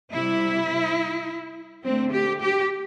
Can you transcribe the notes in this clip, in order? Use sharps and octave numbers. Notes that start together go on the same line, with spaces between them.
C3 G3 E4
D3 A3 C4
G4
G4